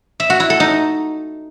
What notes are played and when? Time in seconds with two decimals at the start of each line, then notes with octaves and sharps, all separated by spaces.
0.20 E5
0.30 F#4
0.40 E4
0.50 A4
0.60 D#4